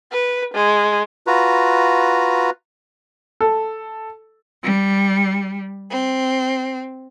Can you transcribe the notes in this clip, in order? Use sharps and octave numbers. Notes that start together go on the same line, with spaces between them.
B4
G#3
F4 F#4 B4 A#5
A4
G3
C4